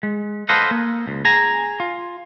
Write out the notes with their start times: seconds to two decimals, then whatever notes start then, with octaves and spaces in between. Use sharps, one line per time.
0.03 G#3
0.49 A4 B4 C5 D#5 F5 F#5
0.71 A#3
1.07 C#2
1.25 G#4 G#5 A#5
1.80 F4